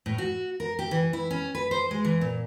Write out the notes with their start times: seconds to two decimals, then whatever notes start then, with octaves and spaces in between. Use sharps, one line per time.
0.06 A2
0.18 F#4
0.60 A#4
0.79 G4
0.91 E3
1.13 E4
1.31 C#4
1.55 B4
1.71 C5
1.91 G#3
2.05 E3
2.21 A#2